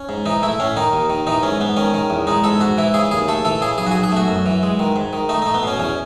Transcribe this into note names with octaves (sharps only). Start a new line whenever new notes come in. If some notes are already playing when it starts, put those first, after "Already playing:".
Already playing: C#4
G#2
E3 D#4
A3 E4
A2 C#4
D#3 D#4
D#2
D#3
E3 D#4
G#2 C#4
G#2 B3
D#3 C#4
D#3
E2
G#3 D#4
G#2 A4
G#2 F#4
E3 E4
C#3 G#4
D#2 G#4
A3 A4
E3 A4
C#3 G#4
B1 G#4
F#4
G#4
B1
G#4
A3 F#4
F#2
E3
G#3
D#3
G#2
D#3
A3 D#4
A3 D#4
B3
B2 C#4
E2 C#4